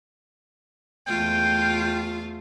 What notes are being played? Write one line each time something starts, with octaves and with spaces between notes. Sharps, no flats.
E2 A3 F4 G5